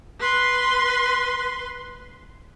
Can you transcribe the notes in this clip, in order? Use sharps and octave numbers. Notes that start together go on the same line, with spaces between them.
B4 C6